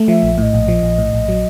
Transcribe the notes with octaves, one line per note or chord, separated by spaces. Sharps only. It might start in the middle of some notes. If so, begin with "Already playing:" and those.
Already playing: A3
F3 E5
A#1
A2 D#5 E5
A#1
F3
A#1
A2
A#1
F#3